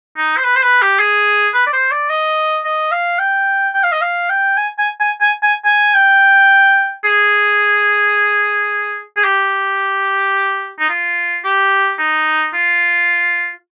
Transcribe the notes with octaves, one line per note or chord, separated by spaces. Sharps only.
D#4
C5
B4
C5
B4
G4
G#4
B4
D5
C5
D5
D#5
D#5
F5
G5
G5
F5
D#5
F5
G5
G#5
G#5
G#5
G#5
G#5
G#5
G5
G#4
G#4
G4
D#4
F4
G4
D#4
F4